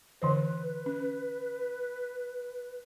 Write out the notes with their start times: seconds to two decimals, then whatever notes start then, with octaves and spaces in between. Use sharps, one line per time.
0.22 D3 E3 B4 C5
0.86 C#4